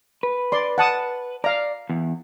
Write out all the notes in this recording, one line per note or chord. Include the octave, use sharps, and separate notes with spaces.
B4
D5 C6
F#5 A5 D#6
D5 F5 A#5
E2